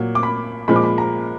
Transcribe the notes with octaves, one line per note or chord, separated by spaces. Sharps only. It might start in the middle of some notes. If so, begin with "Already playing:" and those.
Already playing: A#2 F#3
D6
B5
A#2 F3 G#3 B5
D6
B5
A#5